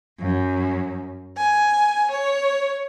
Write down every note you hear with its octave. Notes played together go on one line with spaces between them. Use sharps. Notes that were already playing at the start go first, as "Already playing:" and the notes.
F#2
G#5
C#5